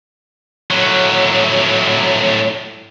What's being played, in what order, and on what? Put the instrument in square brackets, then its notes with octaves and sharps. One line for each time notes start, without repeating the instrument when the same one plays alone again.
[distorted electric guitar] A2 F#3